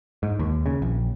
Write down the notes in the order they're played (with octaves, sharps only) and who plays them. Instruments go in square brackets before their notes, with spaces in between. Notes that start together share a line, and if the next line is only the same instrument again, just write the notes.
[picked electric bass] G#2
D#2
C#3
A#1